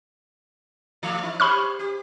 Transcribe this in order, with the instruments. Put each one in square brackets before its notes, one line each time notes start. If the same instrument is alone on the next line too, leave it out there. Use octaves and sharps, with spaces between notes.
[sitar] E3 A3 D5
D#4
[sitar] G4 C5 C#5 [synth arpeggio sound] B5 C#6 F6
[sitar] G4